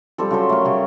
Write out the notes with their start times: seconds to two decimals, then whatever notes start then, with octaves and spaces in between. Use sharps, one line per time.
0.18 F3 G3 C4 A4
0.31 C#3 F#3 A4 C5
0.49 A3 A#4
0.65 C#3 G3